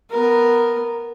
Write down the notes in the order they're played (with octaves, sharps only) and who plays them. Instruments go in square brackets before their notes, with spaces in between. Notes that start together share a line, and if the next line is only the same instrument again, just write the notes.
[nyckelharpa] B3 A#4